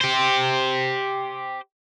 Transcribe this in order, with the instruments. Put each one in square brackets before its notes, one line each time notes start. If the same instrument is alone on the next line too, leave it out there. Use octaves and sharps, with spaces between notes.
[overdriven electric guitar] G4 C5